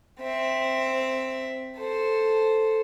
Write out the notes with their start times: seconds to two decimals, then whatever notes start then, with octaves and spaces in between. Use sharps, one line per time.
0.20 C4 E5
1.79 A4 C5